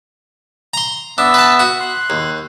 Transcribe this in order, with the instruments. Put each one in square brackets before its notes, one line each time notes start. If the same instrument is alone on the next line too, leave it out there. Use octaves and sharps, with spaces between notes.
[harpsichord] A#5 C6
[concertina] B3 E5 E6 [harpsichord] D4
[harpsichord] B4 A5
F#4
[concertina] C6 F#6
[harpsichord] D#2